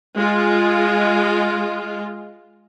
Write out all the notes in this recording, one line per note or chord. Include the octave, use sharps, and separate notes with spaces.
G#3 F4